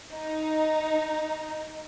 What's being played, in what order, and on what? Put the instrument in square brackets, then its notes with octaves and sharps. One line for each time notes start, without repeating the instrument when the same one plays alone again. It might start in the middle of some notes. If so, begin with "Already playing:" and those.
[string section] D#4